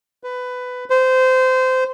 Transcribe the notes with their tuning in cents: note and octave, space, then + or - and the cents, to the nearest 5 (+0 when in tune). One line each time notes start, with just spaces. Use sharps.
B4 +15
C5 -20